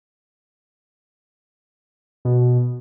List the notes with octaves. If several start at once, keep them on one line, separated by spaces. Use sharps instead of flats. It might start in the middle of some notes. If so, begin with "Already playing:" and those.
B2